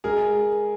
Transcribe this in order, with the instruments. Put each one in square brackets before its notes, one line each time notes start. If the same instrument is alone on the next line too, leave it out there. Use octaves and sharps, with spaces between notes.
[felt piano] G#3 [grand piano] G#4 A#4